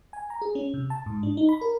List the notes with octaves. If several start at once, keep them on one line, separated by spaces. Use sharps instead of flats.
G#5
A#5
G#4
C#4
C3
A5
G#2
D4
D#4
B5
A#4